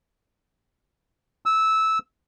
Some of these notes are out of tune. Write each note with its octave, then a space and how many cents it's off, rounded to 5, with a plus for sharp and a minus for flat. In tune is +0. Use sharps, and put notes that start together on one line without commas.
E6 -15